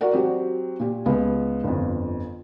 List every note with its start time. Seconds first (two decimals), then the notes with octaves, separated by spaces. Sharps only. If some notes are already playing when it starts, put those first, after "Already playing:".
0.01 F#4 A#4 D5 F#5
0.13 F#3 C4 G4
0.80 A#2 G4
1.06 C#2 B3
1.64 G1 F2